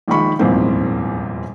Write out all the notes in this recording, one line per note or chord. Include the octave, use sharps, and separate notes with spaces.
A#1 A#2 D#3 G#3 B5 C#6
D#1 A#1 E2 G#2 A#3 C4